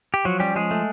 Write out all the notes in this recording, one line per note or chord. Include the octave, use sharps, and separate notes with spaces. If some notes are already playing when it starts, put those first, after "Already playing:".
G4
F3 F#3 F#4
G3 C#4 G4
F3 G#3 G#4
A3